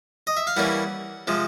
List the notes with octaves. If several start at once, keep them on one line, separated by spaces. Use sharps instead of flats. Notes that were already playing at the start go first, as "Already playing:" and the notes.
D#5
E5
F5
E3 G3 A#3 C#4 F#5
C3 F3 G#3